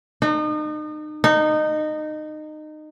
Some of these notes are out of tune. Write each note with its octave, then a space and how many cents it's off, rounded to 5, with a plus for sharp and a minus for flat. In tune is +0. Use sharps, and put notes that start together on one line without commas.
D#4 -35
D#4 -20